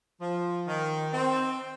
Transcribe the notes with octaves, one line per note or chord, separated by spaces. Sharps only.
F3
D#3
C4